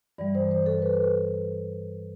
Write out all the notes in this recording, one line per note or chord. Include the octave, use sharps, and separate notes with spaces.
G2 E3 G3 D5
C5
C5
A4
B4